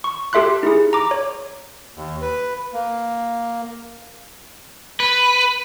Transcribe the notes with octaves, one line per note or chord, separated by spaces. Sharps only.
C#6
G4 A4 E5 C6 F#6
D#4 E4 G#4
A#5 D6
C#5
D#2
B4
A#3
B4